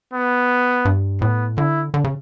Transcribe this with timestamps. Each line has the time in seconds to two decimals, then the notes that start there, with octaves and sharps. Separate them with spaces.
0.14 B3
0.85 G2
1.21 A2 B3
1.58 D3 E4
1.94 D3
2.04 C#3